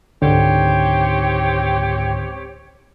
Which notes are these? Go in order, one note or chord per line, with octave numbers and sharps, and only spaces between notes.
C#2 G#2 D3 C4 G4 C#5